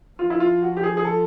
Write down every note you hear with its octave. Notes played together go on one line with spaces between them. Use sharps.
F3 F4
E4
F4
F#4
G4
G#4
G#4
A4